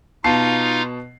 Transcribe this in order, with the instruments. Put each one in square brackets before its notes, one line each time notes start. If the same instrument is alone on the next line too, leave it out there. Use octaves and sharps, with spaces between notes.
[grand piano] B2 A5 C7 [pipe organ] D#4 F4 F5